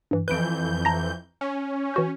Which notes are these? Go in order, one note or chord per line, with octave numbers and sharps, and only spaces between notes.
G2 E3
F2 E3 B4 G6 D7
A5 A#5 A#6
C#4
E3 F#4 G6